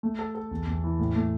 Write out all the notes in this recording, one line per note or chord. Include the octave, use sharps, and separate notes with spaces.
A3
A4
A4
E2
E2
E3
A2
A3